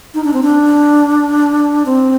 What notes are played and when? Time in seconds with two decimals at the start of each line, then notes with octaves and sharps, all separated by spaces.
0.14 D#4
0.24 D4
0.33 C4
0.43 D4
1.86 C4